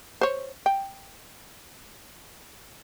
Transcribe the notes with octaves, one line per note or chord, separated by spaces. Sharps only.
C5 C#5
G5